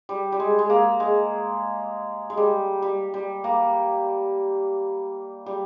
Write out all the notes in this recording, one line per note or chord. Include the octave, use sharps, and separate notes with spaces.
G3
G3
G#3
G#3
A#3
G#3
G#3
G3
G3
G3
A#3
G3